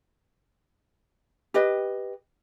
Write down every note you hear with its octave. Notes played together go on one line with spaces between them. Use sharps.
G4 B4 D#5